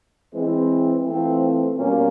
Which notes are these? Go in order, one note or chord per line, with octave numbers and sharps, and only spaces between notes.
E3 G#3 C4
E3 A3 C4 F4
B2 G3 A#3 C#4 F4